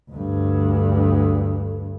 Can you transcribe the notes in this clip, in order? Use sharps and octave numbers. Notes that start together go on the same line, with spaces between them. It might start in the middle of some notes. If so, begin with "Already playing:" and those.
D2 G2